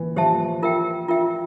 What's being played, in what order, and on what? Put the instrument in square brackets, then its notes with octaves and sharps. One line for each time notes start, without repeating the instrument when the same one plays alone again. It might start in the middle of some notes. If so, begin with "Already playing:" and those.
Already playing: [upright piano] E3
[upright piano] F3 [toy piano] G4 C5 E5 A5
[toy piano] F4 A#4 E5 G5
F4 A#4 E5 G5